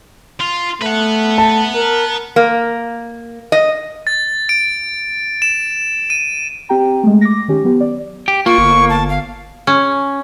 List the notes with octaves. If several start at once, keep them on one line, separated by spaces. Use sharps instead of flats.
F4
A3 B4 F#5
A5
A#4
A#3
D#5
A6
D7
E7
D#7
C4 G4 G5 A#5
G#3 A3
D6 A#6
D#3 C#4 G4
F#3 B3 G4
D5
G4
A#3 F4 C#6
G1
A5
F5
C#4